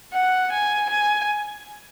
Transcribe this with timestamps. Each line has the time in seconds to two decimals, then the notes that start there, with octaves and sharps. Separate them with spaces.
0.13 F#5
0.52 G#5
0.90 G#5